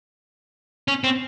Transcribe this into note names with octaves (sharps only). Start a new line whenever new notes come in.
C#4
C4